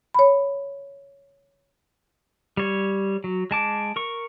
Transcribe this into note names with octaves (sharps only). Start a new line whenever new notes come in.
C#5 B5
G3 C#5
F#3
G#3 A5 D6
A#4 C#6